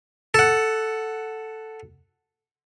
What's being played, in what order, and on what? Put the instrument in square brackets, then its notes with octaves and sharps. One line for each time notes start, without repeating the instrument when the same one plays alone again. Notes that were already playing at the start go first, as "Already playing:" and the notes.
[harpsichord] A4 F#5